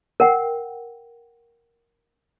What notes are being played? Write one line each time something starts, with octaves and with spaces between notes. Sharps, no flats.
A#4 F#5 G5